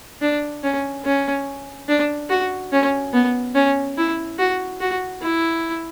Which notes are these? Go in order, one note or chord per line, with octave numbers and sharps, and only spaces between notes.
D4
C#4
C#4
D4
F#4
C#4
B3
C#4
E4
F#4
F#4
E4